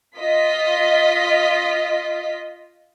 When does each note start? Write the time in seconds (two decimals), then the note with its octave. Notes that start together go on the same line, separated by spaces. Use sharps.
0.18 F4 D#5 B6